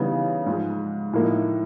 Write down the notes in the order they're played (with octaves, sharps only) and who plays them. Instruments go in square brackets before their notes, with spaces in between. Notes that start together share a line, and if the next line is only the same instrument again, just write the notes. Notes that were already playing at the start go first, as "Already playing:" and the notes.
Already playing: [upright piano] C#3 E3 G3 B3 D#4
G#2 F3 G#3
A2 F3 A#3 D#4